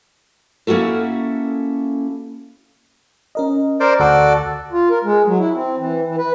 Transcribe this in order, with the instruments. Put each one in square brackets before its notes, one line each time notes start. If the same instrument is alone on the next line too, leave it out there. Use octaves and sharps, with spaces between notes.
[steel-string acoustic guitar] A#3 C#4 E4 F#4 A4
[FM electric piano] C#4 A#4 D#5
[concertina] A#4 C5 D5
[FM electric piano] D2 [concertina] F#4 A4 D5
[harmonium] F4
A#4
G#3
F#3
E4
C4
E3
E3
B4